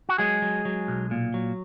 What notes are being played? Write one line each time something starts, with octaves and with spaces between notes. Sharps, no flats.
F#4
F#3 G#3 G#4
F#3
F#3
B1
A#2
F#3